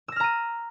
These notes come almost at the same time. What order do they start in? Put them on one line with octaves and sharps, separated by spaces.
E6 A#6 F6 A#5 D#7